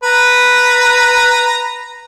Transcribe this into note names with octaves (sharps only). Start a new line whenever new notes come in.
B4 A#5